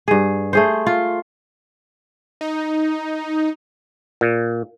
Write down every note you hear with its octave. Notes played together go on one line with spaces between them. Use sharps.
G2 G#4
A3 G#4 C5
F4
D#4
A#2